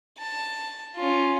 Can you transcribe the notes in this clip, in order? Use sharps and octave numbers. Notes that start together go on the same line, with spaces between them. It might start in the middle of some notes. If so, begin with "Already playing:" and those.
A5
C#4 F4